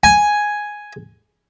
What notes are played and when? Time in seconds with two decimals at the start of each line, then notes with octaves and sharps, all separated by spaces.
0.04 G#5